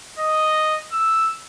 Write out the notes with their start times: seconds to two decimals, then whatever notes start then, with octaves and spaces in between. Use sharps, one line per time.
0.19 D#5
0.93 E6